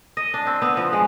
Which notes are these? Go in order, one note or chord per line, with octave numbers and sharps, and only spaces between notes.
D#5
D4
C4
B3
F3
G#3